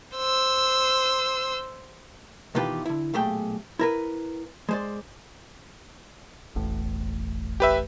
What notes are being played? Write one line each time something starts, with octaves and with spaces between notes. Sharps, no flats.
C5 E6
B2 D#3 E3 F4 G4 B4
D3 E4
B1 A#2 A3 G4 G#4 G5
E4 A#4 B4
G#3 C5 D5
E1 A1 A2
G4 B4 E5